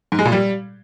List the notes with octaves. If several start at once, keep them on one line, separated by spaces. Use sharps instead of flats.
G#2
G#3
A#2
G3